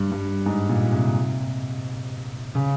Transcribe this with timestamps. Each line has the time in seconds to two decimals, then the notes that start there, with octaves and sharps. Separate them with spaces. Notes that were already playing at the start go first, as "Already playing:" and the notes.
Already playing: G2
0.11 G2
0.46 G#2
0.69 A#2
0.92 C3
2.55 C#3